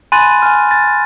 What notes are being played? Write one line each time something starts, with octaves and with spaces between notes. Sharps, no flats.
G#5 B5 C6 F#6 A6 D#7
G#5 F6
A6